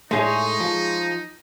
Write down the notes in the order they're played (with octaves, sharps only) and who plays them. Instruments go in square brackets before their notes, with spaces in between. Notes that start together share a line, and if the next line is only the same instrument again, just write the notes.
[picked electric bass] A2 A3 [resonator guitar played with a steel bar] G#3 G#4 C#5 [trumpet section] D#4
[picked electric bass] F3